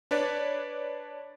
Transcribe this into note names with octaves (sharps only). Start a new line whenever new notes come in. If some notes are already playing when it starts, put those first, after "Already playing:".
D4 B4 C#5 D5